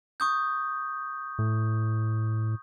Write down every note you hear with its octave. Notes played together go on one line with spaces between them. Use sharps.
C#6 D#6 G6
A2